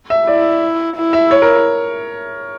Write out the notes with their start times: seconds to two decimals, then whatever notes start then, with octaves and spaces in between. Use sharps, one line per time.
0.10 E5
0.27 E4 D5
0.96 E4
1.13 E5
1.31 C#5
1.42 A#4